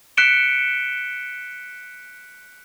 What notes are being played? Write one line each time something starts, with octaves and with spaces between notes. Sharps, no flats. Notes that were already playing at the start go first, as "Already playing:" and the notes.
F#6 B6 C#7 D7 E7 G7